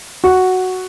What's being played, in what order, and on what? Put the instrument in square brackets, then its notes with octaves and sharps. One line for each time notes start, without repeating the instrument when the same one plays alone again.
[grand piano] F#4